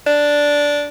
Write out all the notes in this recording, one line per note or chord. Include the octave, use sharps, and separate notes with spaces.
D4